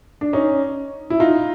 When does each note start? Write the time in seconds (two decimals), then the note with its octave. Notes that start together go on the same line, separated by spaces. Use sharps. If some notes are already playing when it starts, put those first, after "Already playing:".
0.21 D4
0.33 C#4 D#4
1.10 E4
1.20 D#4 F4